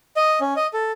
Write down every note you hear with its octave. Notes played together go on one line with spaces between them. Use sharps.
D#5
C#4
D#5
A4